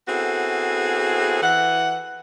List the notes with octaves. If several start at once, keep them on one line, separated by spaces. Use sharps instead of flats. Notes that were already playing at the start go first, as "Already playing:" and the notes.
B3 C4 E4 F#4 G#4 A4
E3 F#5